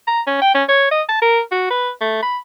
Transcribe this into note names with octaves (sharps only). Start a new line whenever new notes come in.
A#5
C#4
G5
C#4
C#5
D#5
A5
A#4
F#4
B4
A3
B5